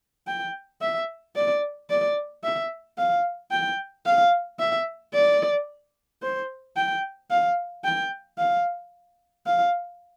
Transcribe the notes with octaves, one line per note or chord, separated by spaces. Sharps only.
G5
E5
D5
D5
E5
F5
G5
F5
E5
D5
C5
G5
F5
G5
F5
F5